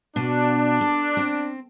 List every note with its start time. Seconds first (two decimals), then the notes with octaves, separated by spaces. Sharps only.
0.16 B2 D4 F#4
0.81 A4
1.17 C4